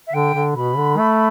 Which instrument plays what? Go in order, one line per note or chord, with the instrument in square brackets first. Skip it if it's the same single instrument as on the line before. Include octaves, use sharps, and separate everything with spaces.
[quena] E5
[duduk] D3 [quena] G5
[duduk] D3
[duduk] B2 [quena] B5
[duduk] D3
A3